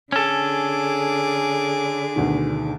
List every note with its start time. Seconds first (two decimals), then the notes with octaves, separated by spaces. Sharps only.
0.12 D3 C#4 G#4 A4 D6
2.16 D2 B2 D#3